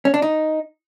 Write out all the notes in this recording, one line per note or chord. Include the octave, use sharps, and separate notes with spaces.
C#4
D4
D#4